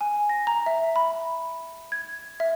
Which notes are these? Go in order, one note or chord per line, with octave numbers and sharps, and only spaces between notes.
G#5
A#6
A#5
E5
B5
G#6
E5